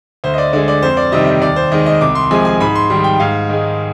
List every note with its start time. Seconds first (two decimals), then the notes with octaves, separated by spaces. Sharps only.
0.24 D2 C5
0.34 D#5
0.38 D5
0.53 D3 G#3 D5
0.68 D5
0.83 F2 C5
0.97 D5
1.12 C3 D#3 G3 D#5
1.27 D#5
1.42 D#2 D5
1.56 C5
1.71 D#3 G#3 D#5
1.86 D#5
2.01 C2 D6
2.15 C6
2.31 C3 F3 G#3 G#5
2.45 G#5
2.60 G#2 B5
2.75 C6
2.90 D#3 G3 C6
3.04 G5
3.20 G#2 F5
3.49 D#3 G#3